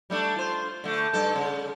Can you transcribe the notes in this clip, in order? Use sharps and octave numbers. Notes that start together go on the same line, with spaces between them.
G3 A3 D4
F4 C5
D3 A3
G2 A4
C#3